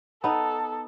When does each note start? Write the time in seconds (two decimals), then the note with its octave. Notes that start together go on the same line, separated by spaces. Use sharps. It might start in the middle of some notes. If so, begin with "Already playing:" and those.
0.24 B3 D#4 A4